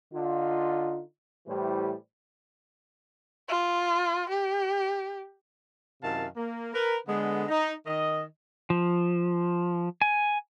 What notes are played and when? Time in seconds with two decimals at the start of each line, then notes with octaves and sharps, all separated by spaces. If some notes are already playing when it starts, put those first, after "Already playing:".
0.13 D3 D#4 F4
1.47 A2 E3 G3 G4 C5
3.49 F4
4.29 G4
6.02 F#2 C3 D#3 E4 F5 A5
6.36 A#3
6.73 A#4 B4
7.07 D3 G#3 B3
7.48 D#4
7.86 D#3 D#5
8.70 F3
10.02 G#5